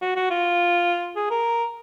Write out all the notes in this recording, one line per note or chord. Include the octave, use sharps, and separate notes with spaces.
F#4
F#4
F4
G#4
A#4